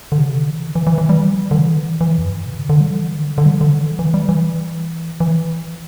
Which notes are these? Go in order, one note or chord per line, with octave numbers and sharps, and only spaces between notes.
D3
C3
D3
E3
E3
E3
E3
G3
E3
G3
D3
E3
D3
E3
E3
E2
G2
C3
D3
D3
G3
E3
D3
D3
G3
E3
D3
E3
E3
G3
E3
E3